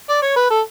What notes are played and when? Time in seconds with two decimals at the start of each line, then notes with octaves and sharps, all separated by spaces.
0.09 D5
0.22 C#5
0.36 B4
0.50 A4